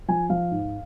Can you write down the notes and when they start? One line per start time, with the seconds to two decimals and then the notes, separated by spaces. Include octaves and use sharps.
0.08 F3 G#5
0.30 F3 F5
0.51 G#2